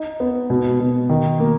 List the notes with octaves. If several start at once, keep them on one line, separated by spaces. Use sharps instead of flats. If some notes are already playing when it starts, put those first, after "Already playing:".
Already playing: D#4
B3
B2
B2
D#3
A#3